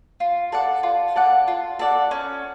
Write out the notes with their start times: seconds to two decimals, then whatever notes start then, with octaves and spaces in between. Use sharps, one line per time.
0.20 F4
0.52 A4 D5 F#5
0.83 F4
1.16 A4 D5 F#5
1.48 F4
1.79 A4 D5 F#5
2.11 C#4